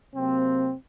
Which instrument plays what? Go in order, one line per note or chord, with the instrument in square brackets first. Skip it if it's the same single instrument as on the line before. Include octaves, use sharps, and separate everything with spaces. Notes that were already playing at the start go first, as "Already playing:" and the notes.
[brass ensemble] C3 F#3 A#3 C4